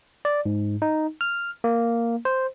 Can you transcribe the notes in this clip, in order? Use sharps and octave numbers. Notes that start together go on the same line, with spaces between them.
D5
G#2
D#4
F6
A#3
C5